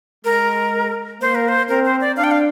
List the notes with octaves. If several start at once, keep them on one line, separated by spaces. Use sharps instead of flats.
G#3 A#4
A#3 C5
A#4
C5
C4 A#4
C5
D5
D4 F5
G5
F5